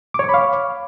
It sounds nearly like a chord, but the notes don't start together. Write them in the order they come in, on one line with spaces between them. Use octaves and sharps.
D6 C#5 C#6 B5 F5